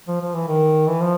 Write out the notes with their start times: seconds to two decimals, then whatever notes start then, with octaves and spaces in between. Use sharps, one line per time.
0.08 F3
0.21 F3
0.35 E3
0.48 D#3
0.87 E3
1.01 F3